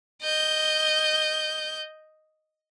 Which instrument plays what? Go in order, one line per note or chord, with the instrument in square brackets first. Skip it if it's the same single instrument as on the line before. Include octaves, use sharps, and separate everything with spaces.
[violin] D#5 G6